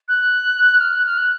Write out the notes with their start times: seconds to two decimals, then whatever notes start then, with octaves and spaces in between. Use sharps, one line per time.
0.08 F#6
0.80 F6
0.93 F#6
1.06 F6
1.18 F#6